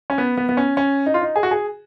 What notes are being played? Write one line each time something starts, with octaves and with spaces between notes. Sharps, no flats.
C#4
B3
B3
B3
C#4
C#4
D#4
F4
D#4
G#4
F#4
G#4